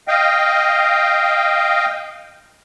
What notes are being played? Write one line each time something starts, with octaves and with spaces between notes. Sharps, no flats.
D#5 F5 G5